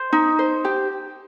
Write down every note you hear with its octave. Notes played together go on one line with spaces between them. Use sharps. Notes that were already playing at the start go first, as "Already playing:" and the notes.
Already playing: C5
D#4
C5
G4